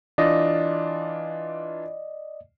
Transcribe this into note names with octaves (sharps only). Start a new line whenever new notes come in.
E3 D4 F4 D5 D#5